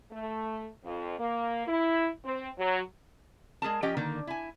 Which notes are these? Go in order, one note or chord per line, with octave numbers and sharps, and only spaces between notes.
A3
F2
A#3
E4
C4
F#3
G#3 G#4 A#4 A5
F3 C#4 G4 D#5 G5
D3 D#3 A#3
E4 G#5